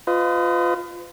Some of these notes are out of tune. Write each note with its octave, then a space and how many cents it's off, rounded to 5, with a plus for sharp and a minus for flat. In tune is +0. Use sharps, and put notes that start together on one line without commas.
F4 +5 B4 +40 D#5 +0